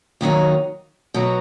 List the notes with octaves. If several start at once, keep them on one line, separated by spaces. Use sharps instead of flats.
D#2 D#3 F#3 D#4
B2 F#3 B3 D#4